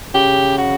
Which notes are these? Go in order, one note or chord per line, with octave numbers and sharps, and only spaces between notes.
C#3 G4
F#4